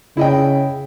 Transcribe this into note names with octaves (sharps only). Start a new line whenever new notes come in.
C#3 E4 D#5 G5